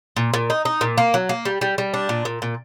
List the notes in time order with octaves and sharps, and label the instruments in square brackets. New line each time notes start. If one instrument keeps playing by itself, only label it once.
[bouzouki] A#2
A#2
D#4
D#4
A#2
A#3
F#3
A#3
G3
G3
G3
D4
A#2
A#2
A#2